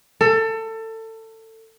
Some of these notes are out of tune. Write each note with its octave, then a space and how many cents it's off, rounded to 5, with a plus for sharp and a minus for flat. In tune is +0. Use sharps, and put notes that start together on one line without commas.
A4 +25